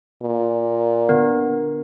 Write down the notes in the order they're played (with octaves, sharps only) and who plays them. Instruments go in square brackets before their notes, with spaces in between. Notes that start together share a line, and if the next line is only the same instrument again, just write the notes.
[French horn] A#2
[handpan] D3 A#4 [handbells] B3